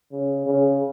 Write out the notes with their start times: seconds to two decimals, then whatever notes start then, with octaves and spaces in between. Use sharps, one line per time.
0.12 C#3
0.46 C#3